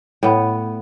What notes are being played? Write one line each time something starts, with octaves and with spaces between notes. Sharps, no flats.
A2 B3